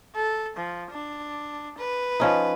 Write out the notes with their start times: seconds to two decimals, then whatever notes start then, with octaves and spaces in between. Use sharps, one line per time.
0.15 A4
0.57 F3
0.91 D4
1.78 B4
2.20 F3 C#4 D#4